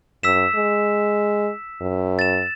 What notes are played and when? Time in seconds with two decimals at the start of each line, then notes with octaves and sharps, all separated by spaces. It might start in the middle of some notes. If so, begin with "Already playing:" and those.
0.23 F#2 E6 B6 E7
0.56 G#3
1.81 F#2
2.19 A6 E7